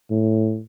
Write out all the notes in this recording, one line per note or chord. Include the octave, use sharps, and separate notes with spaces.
A2